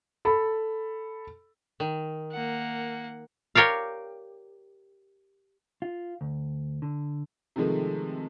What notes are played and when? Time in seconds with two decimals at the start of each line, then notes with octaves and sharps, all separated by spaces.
0.25 A4 B5
1.80 D#3
2.32 A#3 F#5
3.55 G4 A#4 C#5 D5 F5
5.82 F4
6.21 D2
6.82 D3
7.56 C3 D#3 F3 G#3 A3